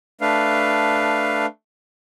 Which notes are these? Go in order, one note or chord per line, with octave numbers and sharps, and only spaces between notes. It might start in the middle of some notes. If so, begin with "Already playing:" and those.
A3 D4 B4 F5